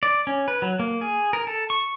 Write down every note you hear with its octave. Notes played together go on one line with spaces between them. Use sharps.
D5
C#4
B4
F#3
A#3
G#4
A#4
A4
C#6